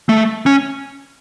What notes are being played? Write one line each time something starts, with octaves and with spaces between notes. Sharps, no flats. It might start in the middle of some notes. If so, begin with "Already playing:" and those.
A3
C#4